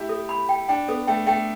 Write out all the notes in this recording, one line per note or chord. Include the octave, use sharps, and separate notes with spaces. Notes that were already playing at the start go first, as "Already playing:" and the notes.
Already playing: A3 E4 G4
A4
B5
G5
D4 G5
B3 A4
A3 G5
A3 G5